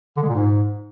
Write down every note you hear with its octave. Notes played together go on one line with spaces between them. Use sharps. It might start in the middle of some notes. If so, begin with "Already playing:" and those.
D3
G#3
A#2
G#2